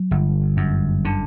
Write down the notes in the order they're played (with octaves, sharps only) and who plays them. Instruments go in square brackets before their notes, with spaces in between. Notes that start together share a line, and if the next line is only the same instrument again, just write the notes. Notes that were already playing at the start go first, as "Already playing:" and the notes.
Already playing: [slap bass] F#3
G1
F#2
D3